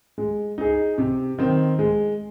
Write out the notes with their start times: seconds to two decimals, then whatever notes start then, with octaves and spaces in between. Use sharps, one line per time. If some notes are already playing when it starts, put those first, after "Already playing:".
0.18 G#3
0.58 D#4 G#4
0.98 C3
1.39 D#3 C4
1.79 G#3